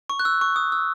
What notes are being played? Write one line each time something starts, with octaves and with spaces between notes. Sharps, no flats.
C#6
F#6
E6
C#6
D#6
E6